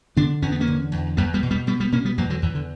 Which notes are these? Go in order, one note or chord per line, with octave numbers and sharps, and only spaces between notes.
D3 B3 D4
E2 C#4
B3
A#3 C#4
D3
E2
E2 G3 B3
G3 B3
B2
G3 B3
B2 G3 B3
G3 B3
B2 A#3 C#4
G3 B3
E2 F#3 A#3
D3 F#3
E2 E3
D3